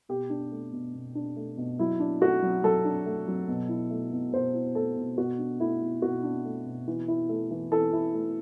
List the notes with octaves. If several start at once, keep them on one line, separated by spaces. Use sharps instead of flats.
B2 G4
D4
A3
B2
B2
D4
A3
B2
F#3 E4
D4
A3 F#4
F#3
F#3 A4
D4
A3
F#3
B2
E4
A3
B2
B2 C5
E4
A3 A4
B2
B2 F#4
D4
A3 E4
B2
B2 F#4
D4
A3
B2
E3
E4
A3
E3
E3 A4
E4
A3